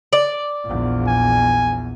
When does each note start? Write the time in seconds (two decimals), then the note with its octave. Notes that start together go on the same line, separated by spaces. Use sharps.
0.13 D5
0.64 A#1 E2
1.08 G#5